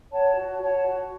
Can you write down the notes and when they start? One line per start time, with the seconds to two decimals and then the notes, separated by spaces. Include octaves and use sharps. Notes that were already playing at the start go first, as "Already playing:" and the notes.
0.11 C#5 F#5 A5
0.35 F#4
0.61 C#5 F#5 A5
0.85 F#4